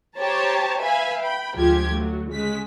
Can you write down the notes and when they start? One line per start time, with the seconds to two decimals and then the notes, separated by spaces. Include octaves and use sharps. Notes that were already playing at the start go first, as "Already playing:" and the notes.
0.18 G4 C5 C#5 A5 A#5
0.81 B4 E5 F5 G#5 B5
1.20 G5 B5
1.55 D2 F3 G#3 F4 G4 G#6
1.93 F#3 A3
2.30 C#3 G#3 B6